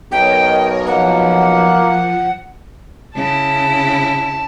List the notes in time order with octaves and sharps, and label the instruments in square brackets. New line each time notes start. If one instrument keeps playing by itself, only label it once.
[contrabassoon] B1 [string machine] A#4 C#5 D#5 [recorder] G5
[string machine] F3 [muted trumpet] A#3 [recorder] F#5
[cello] C#3 E4 [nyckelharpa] A5